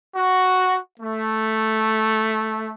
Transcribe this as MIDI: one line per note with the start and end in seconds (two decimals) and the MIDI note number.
0.15 0.77 66
0.99 2.73 57